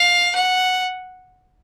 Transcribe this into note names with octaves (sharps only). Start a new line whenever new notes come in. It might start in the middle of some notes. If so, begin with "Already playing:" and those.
Already playing: F5
F#5